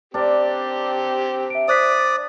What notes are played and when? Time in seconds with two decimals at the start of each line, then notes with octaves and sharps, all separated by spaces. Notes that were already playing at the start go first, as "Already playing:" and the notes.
0.14 C4 D4 G4 A#4
1.50 E5 D7
1.68 C5 D5 D#6 F#6 B6